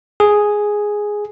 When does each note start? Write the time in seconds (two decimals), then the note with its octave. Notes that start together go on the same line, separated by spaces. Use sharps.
0.20 G#4